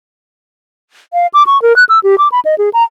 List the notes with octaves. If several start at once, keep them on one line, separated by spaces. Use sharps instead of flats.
F5
D6
C#6
A#4
F#6
E6
G4
D6
B5
D#5
G#4
A#5